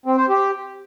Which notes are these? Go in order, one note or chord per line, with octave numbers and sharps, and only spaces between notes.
C4
C5
G4